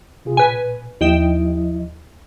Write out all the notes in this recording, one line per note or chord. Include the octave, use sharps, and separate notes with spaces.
C3 F4 G#4
A#2 B4 G#5
D#2 F3 E4 D#5 G5 E7